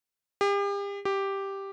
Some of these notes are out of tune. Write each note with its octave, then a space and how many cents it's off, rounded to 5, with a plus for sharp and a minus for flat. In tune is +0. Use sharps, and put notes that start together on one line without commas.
G4 +40
G4 +0